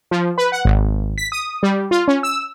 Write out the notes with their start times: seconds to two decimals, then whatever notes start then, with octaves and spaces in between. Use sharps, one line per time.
0.11 F3
0.38 B4
0.52 F#5
0.65 G#1
1.18 B6
1.32 D#6
1.63 G3
1.91 F4
2.08 C#4
2.23 E6